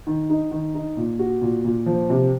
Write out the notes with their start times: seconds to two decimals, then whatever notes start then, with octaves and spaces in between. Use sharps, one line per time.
0.07 D#3
0.30 D#4
0.51 D#3
0.75 D#4
0.97 A#2
1.19 F#4
1.42 A#2
1.65 A#2
1.86 F3
2.10 C3